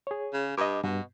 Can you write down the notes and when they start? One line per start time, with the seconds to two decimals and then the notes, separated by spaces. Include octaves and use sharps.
0.07 G#4 C#5
0.33 C#3
0.58 G2 D#5 D6
0.84 G2 B2